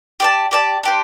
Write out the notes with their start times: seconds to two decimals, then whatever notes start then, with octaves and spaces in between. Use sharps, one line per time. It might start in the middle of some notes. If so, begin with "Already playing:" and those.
0.20 G4 D5 A5
0.51 G4 D5 A5
0.83 D4 G4 C5